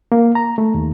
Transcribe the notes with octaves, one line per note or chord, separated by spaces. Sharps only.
A#3
A#5
A3
D#2